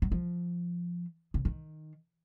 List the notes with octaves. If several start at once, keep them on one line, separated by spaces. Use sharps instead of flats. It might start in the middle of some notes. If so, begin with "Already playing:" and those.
F#3
F3
C#3
D#3